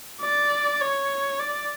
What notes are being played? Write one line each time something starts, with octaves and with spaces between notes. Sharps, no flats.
D5
C#5
D5